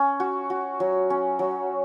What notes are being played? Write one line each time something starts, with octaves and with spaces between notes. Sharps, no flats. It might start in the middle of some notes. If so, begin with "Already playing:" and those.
Already playing: C#4
F#4
F#4
F#3
C#4
F#3